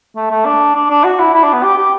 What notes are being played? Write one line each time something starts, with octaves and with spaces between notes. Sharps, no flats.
A3
A3
D4
D4
D4
F#4
E4
E4
D4
B3
G4
G4